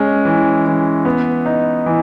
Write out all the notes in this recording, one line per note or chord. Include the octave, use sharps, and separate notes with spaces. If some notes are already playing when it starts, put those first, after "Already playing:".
Already playing: G#3 C#4
E3
E3
B3
D#4
E3